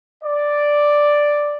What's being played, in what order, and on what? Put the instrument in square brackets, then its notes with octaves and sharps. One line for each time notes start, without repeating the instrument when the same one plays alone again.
[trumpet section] D5